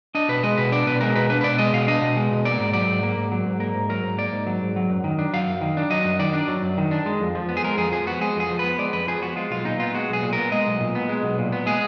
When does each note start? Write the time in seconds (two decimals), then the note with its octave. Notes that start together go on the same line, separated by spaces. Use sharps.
0.15 D4 D#5
0.29 B2 B4
0.43 G#3 D#5
0.58 B2 B4
0.72 D4 D5
0.86 B2 B4
1.01 G#3 A#4
1.16 B2 B4
1.30 D4 B4
1.41 B4
1.44 B2 D5
1.58 G#3 D#5
1.73 B2 F5
1.87 D4 D#5
2.01 B2
2.17 G#3
2.31 B2
2.45 A#3 D5
2.59 G#2
2.73 F#3 D5
2.88 G#2
3.03 A#3
3.17 G#2
3.32 F#3
3.46 G#2
3.60 A#3 A#4
3.75 G#2
3.89 F#3 A#4
4.03 G#2
4.18 A#3 D5
4.33 G#2
4.47 F#3
4.62 G#2
4.76 F#3
4.90 F#2
5.04 D#3
5.19 D4
5.33 F#3 F5
5.48 F#2
5.61 D#3
5.77 D4
5.90 F#3 D#5
6.05 F#2
6.19 D#3 D5
6.34 D4
6.48 F#3
6.62 F#2
6.77 D#3
6.91 D4
7.06 G#3
7.21 F2
7.35 F3
7.49 B3
7.57 G#4
7.64 G#3 A#4
7.78 F2 G#4
7.92 F3 G#4
8.07 B3 F#4
8.21 G#3 G#4
8.36 F2 G#4
8.50 F3
8.59 B3 B4
8.78 G#3 D5
8.93 F2 B4
9.07 F3 G#4
9.22 B3 F#4
9.36 G#3 F4
9.51 B1 F4
9.65 A#2 D#4
9.80 B3 F4
9.94 G#3 F#4
10.09 B1 G#4
10.23 A#2
10.33 B3 A#4
10.52 G#3 D#5
10.67 B1
10.80 A#2
10.95 B3
11.09 G#3
11.23 B1
11.38 A#2
11.52 B3
11.66 G#3 G#4